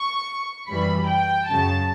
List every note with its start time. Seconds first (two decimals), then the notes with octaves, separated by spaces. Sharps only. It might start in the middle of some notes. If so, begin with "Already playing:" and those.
Already playing: C#6
0.68 F#2 E3 G3 B5
1.08 G5
1.47 F#2 C#3 F#3 A5